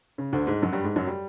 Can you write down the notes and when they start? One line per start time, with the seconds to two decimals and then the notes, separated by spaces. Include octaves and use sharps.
0.18 C#3
0.33 D2 D3
0.47 G#2 G#3
0.62 F#2 F#3
0.73 G2 G3
0.84 G#2 G#3
0.96 F#2 F#3
1.07 G3